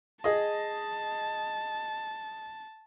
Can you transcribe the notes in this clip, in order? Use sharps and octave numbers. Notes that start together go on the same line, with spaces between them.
G#4 D#5 A5